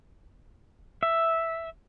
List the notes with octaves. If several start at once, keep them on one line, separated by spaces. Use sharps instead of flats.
E5